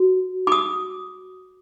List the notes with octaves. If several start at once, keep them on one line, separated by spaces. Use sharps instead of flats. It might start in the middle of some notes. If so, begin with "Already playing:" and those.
Already playing: F#4
D6
D#6